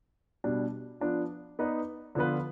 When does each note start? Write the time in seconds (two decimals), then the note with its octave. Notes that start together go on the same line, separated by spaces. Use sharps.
0.44 B2 G3 D4
1.00 F3 B3 D4 F4
1.59 B3 D#4 B4 D5
2.15 D3 F3 B3 F4 B4